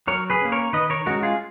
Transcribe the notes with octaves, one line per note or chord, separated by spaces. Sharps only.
F#3 A#4 C#5
G#4 B4
A#3 C#4
A#4 C#5
D#3 B4 D#5
A#4 C#5
G#3 C#4 F#4 A#4
F4 G#4